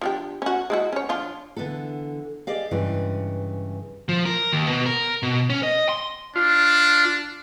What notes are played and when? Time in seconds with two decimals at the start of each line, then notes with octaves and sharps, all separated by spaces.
0.01 F3 D4 G4
0.42 C#4 F#4
0.70 G#3 E4 F#4
0.93 C#4 C#5
1.09 F3 D4 F4
1.56 D3 E3 B3 A4
2.47 G4 G#4 D5 D#5 F5
2.71 G2 C#3 E3 G#3
4.09 F3
4.26 A#4
4.53 D#2
4.68 B2
4.86 A#4
5.23 B2
5.50 C#4
5.63 D#5
5.89 C6
6.36 D4 F4